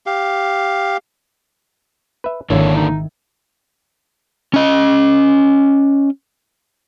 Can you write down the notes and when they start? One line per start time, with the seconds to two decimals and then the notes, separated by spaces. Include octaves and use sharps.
0.06 G4 F5
2.24 B4 E5
2.50 G#1 D3 D#3 A#3 D4 E4 C#5
2.75 D#4
4.54 C#4 D#5